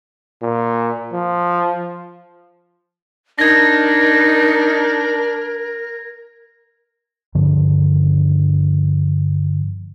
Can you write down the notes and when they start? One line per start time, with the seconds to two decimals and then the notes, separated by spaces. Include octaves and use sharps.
0.42 A#2
1.13 F3
3.39 D4 D#4 A#4 G#6 A#6
7.35 G2 D3 D#3 F3